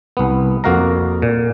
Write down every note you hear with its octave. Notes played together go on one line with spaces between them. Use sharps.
C2 B3
F2 A#3 F#4 F5 A#5
A#2